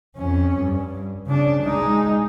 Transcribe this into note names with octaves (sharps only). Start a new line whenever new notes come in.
F2 C#4
G2
C#3 D4
G#3 D#4